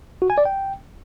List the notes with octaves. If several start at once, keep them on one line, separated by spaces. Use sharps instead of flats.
F#4
G#5
D5
G5